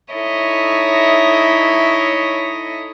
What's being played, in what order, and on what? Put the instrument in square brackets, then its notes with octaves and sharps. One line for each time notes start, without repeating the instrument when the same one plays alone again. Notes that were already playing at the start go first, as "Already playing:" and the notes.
[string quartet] D#4 E4 A4 C#5 D#5 E5